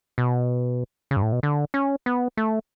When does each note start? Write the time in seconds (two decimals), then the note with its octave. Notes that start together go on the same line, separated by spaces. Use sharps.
0.18 B2
1.11 C#3
1.16 G2
1.22 A2
1.33 B2
1.43 D3
1.74 C#4
2.06 B3
2.37 A3